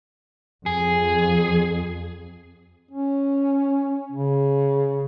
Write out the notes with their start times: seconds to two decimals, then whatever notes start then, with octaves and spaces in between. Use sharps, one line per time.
0.66 F2 G#4
2.91 C#4
4.12 C#3